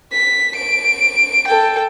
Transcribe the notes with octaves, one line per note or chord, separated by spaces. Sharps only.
B6
D7
A4 G5